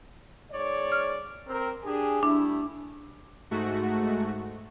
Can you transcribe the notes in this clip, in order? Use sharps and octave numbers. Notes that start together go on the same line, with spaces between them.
G#2 C#5 D5
F6
C4 A#4
D4 G4 G#4
G3 A3 D4 E4
G#2 A3 F#4